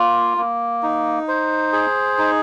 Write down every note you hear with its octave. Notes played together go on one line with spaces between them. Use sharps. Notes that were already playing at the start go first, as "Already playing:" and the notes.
Already playing: A#3 F4
A#3
D#4
C5
G#4
D#4